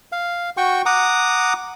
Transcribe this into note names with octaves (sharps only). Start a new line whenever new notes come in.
F5
F#4 G5 C#6
F#5 A#5 D6 D#6